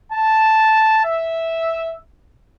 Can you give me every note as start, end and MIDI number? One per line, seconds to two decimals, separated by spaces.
0.12 1.02 81
1.04 1.97 76